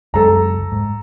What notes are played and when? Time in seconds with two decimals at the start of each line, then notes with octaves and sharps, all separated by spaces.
0.14 C#2 F#2 G#3 A4 A#5
0.72 G#2